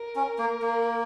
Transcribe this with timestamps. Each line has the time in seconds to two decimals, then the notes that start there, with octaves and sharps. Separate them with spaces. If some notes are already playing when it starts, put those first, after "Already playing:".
Already playing: A#4
0.16 C#4
0.39 A#3
0.62 A#3